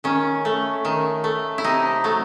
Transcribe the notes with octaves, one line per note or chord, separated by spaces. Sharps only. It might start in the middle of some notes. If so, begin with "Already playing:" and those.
D#3 C#4
A3
D#3
A3
E4
C3 D#4
F#3 A3